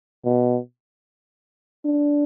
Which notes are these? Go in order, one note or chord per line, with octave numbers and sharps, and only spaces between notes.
B2
D4